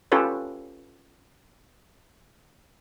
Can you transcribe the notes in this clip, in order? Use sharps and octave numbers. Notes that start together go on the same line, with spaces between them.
C#4 F4 G4 A4 B4 C#5